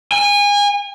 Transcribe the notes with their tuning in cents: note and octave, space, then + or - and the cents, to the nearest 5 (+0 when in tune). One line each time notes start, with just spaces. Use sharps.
G#5 -30